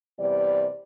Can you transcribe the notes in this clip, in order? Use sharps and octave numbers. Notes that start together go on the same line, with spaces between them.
E2 C3 G3 D5